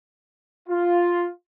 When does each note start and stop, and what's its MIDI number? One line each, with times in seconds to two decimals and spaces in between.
0.69 1.27 65